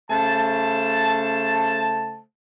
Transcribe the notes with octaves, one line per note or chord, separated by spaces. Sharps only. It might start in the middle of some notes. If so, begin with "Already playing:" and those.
C#3 A3 C5 A5